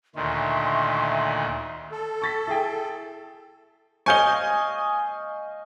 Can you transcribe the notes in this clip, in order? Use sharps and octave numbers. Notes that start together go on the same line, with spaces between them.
D2 A#2 D#3 E5 C6 C#6
A4
C#6 A6 B6
E4 G#4 G5
D#5 F5 G#5 C#6 G6 G7